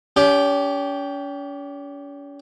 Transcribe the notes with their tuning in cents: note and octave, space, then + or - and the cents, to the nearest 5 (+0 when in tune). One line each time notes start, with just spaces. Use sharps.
C#4 +40 G4 +0